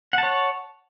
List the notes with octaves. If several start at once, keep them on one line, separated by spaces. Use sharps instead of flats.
C#5 F#5 A5